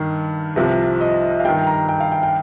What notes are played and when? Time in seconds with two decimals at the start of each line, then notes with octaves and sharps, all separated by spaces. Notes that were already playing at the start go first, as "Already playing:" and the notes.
Already playing: G2 D#3
0.56 C2 C3 F3
1.01 D#5
1.40 F5
1.45 G2 D#3 G5
1.67 A#5
1.89 G5
2.00 F5
2.12 G5
2.23 G5